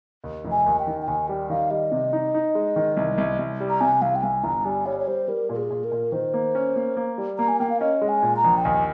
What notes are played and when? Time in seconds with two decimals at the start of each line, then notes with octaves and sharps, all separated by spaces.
0.24 D#2
0.44 F1
0.51 G#5
0.66 D#2
0.79 G5
0.87 D#3
1.02 G5
1.08 D#2 G#5
1.29 G3 G5
1.50 D#3 F5
1.71 G3 D#5
1.92 C3
2.13 D#4
2.34 D#4
2.55 G#3
2.76 D#3
2.97 C2
3.18 C2
3.39 C2
3.60 G3
3.70 A#5
3.81 C3 G#5
4.02 C2 F5
4.15 G5
4.23 C2 G#5
4.44 G1 A#5
4.65 G3 G#5
4.86 G3 C#5
4.99 C#5
5.07 G3 C5
5.28 G3 A#4
5.49 A#2 A#4
5.57 G#4
5.70 A#2
5.84 A#4
5.91 A#2
6.12 D#3 C5
6.34 A#3
6.55 C#4
6.76 A#3
6.97 A#3
7.18 G3
7.38 A#3 A#5
7.48 G#5
7.60 A#3 G5
7.70 F5
7.81 C#4 D#5
8.02 G#3
8.08 G#5
8.22 A#2
8.37 A#5
8.44 A#1
8.57 G5
8.65 D#2 G#5